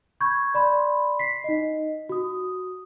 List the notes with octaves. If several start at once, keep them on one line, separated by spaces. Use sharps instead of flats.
B5 C#6 G6 G#6
D5 B5 C6
B6 C7
D#4 D#5
F#4 D#6